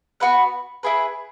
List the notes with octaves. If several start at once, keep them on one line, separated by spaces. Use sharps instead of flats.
B3 F#4 B4 F#5
E4 G#4 B4